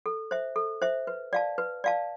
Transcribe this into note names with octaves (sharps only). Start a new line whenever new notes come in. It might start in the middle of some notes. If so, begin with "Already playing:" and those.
A4
C5 E5
A4
C5 E5
B4
D5 F5 A5
B4
D5 F5 A5